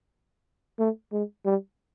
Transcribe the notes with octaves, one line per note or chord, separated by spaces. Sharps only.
A3
G#3
G3